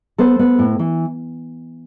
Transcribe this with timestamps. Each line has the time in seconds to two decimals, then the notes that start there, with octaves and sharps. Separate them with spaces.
0.18 B3 A4 C5
0.39 B3
0.59 A2
0.79 E3